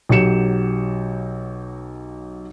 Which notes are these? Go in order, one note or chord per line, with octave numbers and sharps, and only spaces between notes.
B1 F#3 G4 C#7 E7